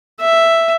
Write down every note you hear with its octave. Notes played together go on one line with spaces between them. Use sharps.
E5